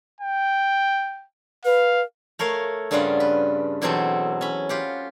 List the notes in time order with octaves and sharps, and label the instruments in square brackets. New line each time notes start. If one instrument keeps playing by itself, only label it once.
[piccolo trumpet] G5
[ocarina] B4 [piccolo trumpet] F5
[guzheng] A3 A#4 C#5 F5
G2 C#3 G3 D4 F4 F#5
B4
E2 B2 F#3 C4 A4
C#4 B5
F4 G4 F#5